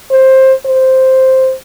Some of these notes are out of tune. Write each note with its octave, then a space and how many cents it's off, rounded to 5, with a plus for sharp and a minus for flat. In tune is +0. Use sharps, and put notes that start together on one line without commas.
C5 +15
C5 +0